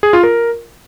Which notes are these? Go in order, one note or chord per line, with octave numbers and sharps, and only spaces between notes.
G#4
F4
A#4